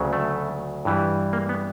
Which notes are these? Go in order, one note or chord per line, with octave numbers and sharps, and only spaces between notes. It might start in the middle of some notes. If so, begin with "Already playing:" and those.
Already playing: D2 C#3 F#3
A3
G2 E3 G3
A#3
B3